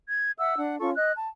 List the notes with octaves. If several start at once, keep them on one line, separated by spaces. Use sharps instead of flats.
G#6
E5 F#5 E6
D4 F#5
C#4 F4 A4 C#6
D#5 F#6
A5